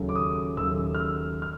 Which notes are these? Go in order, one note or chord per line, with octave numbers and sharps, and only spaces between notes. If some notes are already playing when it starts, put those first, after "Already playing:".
Already playing: D#2 C#3 F#3 A3
D6
D#6
D#2 C#3 F#3 A3 E6
F6
E6
F6